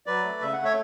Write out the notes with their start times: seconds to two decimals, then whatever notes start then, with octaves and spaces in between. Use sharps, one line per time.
0.06 F#3 B4 D5
0.24 A3
0.41 C#3 E5
0.53 F#5
0.58 A3
0.64 C#5 E5